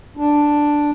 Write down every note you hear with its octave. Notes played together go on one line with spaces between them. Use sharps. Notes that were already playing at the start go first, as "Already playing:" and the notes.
D4